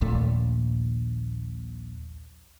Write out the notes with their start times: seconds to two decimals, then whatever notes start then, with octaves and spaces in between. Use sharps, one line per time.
0.01 A#1 D#2 A#2 A3